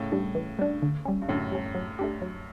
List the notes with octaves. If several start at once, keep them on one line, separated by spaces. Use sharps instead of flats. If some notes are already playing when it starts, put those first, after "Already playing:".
Already playing: A2 C#3
G3 D4
E3
G3 D4
D3
G3 C#4
G2
F#2 A2 D3
G3 C#4
F#3
A3 D4 G4
F#3